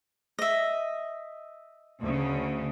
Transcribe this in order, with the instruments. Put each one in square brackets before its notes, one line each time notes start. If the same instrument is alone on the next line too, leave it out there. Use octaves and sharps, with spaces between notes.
[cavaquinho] D#5 E5
[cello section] D2 C#3